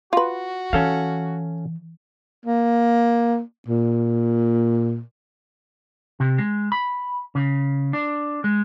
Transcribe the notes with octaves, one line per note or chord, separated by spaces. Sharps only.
F4 F#4 B4
E3 C#4 A4 F5
A#3
A#2
C3
G#3
B5
C#3
D4
G#3